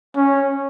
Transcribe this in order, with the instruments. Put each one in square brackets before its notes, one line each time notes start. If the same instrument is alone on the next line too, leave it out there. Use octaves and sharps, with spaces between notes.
[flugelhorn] C#4